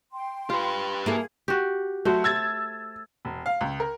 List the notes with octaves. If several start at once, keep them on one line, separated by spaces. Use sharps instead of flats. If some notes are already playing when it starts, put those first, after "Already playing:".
G5 C6
F4 G4 B4
A#3 E4 G#4 A4
F#4 G4
F#3 A3 F#4 C5
E6 G#6 A6
E1
F5
C#2
A#4